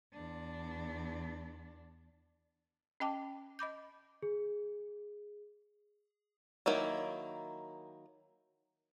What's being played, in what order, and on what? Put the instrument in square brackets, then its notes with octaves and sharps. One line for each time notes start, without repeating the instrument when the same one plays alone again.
[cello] E2 D4
[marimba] C#4 D#5 G5 A5 D6
D#5 B5 D6 G6
[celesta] G#4
[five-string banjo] D#3 F#3 A#3 E4